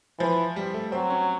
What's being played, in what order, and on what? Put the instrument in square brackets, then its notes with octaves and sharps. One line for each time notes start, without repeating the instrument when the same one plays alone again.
[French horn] E3 [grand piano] F3
[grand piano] G3
A3
[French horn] F#3 [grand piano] C4
[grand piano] C#4